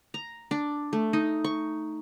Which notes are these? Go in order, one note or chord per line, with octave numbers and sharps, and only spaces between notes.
A#5
D4
A3
D#4
C#6